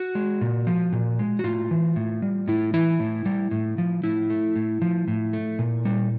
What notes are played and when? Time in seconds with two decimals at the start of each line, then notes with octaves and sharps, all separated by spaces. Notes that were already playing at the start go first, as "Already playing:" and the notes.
Already playing: F#4
0.15 G#3
0.41 A#2
0.67 F3
0.92 A#2
1.19 G#3
1.39 F#4
1.44 A2 F4
1.71 E3
1.96 A2
2.22 G3
2.48 A2 E4
2.74 E3 E4
2.99 A2
3.26 G3
3.51 A2
3.78 F3
4.04 A2 E4
4.30 A3
4.56 A2
4.82 F3
5.08 A2
5.33 A3
5.59 A#2
5.85 G3